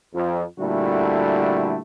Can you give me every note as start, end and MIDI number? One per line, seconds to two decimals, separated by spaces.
0.14 0.43 41
0.59 1.79 46
0.59 1.79 50
0.59 1.79 55
0.59 1.79 57
0.59 1.79 64
0.59 1.79 66